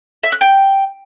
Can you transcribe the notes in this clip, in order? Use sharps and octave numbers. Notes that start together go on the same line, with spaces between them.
E5
F#6
G5